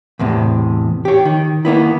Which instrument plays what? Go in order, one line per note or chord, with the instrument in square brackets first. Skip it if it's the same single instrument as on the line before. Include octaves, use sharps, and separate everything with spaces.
[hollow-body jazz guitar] E2 A2 C3
G4 C#5
D#3
D#3 A#3 B3 E4